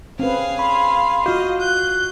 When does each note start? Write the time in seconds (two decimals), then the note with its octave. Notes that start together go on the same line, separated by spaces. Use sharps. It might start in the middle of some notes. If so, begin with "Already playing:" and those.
0.19 C4 C#4 G#4 B4 F5
0.59 B5 C6
1.26 F4 F#4 D#5 F5
1.61 F#6 G6